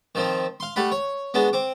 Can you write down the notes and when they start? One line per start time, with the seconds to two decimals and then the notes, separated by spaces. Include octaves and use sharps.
0.15 D#3 F3 C4
0.60 F5 C6
0.76 G3 A3 F#5 B5
0.92 C#5
1.34 G#3 B3 D4 F#4
1.53 C4 D6